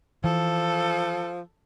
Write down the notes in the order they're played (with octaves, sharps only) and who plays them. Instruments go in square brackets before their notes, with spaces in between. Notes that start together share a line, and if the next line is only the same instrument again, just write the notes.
[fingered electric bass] E3 [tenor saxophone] F3 [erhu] A4